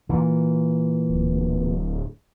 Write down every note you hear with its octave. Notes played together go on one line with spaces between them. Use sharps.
A#2 E3
D1